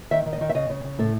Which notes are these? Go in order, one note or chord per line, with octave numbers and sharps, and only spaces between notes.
D#3 E5
D#3
D#5
D#3
E5
C#3 D#5
C#3
C#3
A2 A4